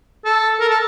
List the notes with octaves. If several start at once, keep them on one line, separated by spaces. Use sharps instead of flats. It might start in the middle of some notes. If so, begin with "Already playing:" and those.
A4
A#4
A4